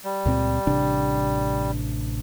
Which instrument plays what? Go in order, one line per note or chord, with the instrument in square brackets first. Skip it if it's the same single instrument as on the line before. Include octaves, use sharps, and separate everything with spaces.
[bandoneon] G3
[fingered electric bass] C#2 A#2 C4
A1 C3 D4